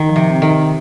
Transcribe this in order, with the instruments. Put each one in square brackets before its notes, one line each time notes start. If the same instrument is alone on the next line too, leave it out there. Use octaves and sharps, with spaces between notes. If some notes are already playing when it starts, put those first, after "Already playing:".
Already playing: [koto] D#3
[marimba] F3
[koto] C3
[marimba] C4
[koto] D#3
[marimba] F3